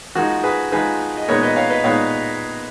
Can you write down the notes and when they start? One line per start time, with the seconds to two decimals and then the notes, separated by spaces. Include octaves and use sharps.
0.15 F3 G#3 D#4 F#4 A#4
0.43 G#4 B4
0.72 F3 G#3 D#4 G#4 B4
1.17 D#5
1.28 A#2 G#3 B3 D#4 A#4 C#5
1.43 B4 D#5
1.56 C#5 F5
1.70 B4 D#5
1.84 A#2 G#3 B3 D#4 C#5 F5